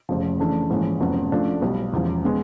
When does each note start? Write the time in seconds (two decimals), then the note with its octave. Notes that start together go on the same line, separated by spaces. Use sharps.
0.09 F1 F2 C#3 F3
0.39 C#3 E3 A3 D4
0.70 A#1 G#2 E3 G#3 C#4
1.00 F1 F2 C#3 F#3 B3
1.31 C#3 F3 A3 D4 F4
1.61 B1 B2 G3
1.92 E1 E2 C#3 F3
2.25 B2 G#3 B3